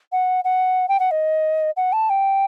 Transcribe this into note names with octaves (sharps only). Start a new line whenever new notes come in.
F#5
F#5
G5
F#5
D#5
F#5
A5
G5